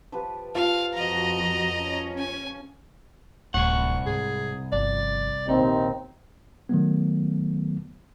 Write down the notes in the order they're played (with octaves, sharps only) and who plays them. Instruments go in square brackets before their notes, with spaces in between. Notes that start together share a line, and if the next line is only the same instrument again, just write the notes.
[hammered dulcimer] F3 G4 B4
[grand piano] F4 [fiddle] F5
[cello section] F2 F#4 [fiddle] D#5 A#5
[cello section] C#4
[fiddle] G#5
[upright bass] D1 [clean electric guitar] C2 F#5 [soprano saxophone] C#6
[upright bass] G#2 C3 [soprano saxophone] G#4
[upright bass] G1 F3 [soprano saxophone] D5
[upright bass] A#1 [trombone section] D#2 C3 C4 [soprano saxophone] D#4
[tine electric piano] D#3 F#3 A3 B3